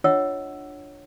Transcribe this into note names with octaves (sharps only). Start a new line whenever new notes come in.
D4 F4 C#5 D#5 F#5 E6